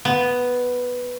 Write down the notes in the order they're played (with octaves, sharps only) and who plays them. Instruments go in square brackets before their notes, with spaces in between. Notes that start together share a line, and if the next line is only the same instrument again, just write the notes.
[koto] B3